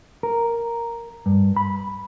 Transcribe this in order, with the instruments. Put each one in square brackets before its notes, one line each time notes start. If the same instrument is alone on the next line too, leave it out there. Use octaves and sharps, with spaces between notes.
[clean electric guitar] A#4
G2
B5